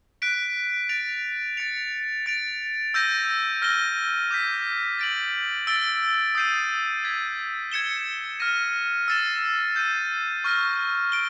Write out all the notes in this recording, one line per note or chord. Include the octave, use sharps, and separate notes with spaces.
F#6 B6 D7
A6 D7 F7
A6 C#7 F7
A6 D7 F7
E6 G6 A#6 D#7
F6 A#6 D#7 G7
D6 G6 B6
A6 D7 F#7
E6 A6 D7 G7
D#6 G6 C7 D#7
G#6 B6 D#7
G#6 C#7 E7 G7
F6 A#6 D#7
E6 A6 C7 E7 G7
G6 C7 D#7
C#6 F6 A#6
D7 G7